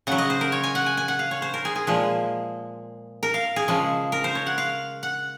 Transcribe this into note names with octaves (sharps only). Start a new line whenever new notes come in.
C#3 F#3 F#5
D#5
C5
A#4
C#5
G#5
F#5
G#5
G#5
F#5
F5
C#5
C5
A#4
G#4
G#4
A#2 F3 G#3
A#4
F5
G#4
C#3 F3 G#3
A#4
C5
C#5
F#5
F5
F#5